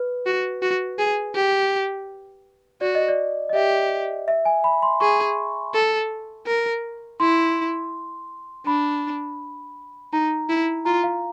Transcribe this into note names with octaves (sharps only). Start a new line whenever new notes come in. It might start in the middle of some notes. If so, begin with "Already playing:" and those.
Already playing: B4
F#4
F#4
G#4
G4
F#4 D5
D#5
D5
D#5
G4 E5
E5
G#5
B5
C6
G#4 C#6
A4
A#4
E4 C6
D4 B5
D#4 A#5
E4
F4 A#5
F5